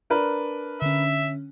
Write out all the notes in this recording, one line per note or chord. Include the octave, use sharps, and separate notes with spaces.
D4 A#4 B4
D3 C#4 E5